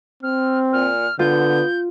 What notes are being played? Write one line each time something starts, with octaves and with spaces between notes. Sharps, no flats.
C4 F6
A#2 F6
D3 B3 F4 G6